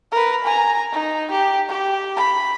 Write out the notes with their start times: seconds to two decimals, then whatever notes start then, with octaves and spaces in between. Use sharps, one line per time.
0.12 A#4 B4
0.44 G#5 A#5
0.92 D#4
1.31 G4
1.69 G4
2.16 B5